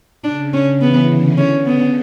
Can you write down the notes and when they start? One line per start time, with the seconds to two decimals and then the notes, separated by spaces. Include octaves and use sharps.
0.24 C#3 D4
0.53 C#3 C#4
0.81 C#3 E3 B3
1.10 D3
1.38 C#4
1.66 C#3 B3